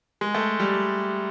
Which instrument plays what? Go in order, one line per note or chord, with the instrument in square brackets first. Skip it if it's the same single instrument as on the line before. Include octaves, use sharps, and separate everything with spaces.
[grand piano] G#3
A3
G3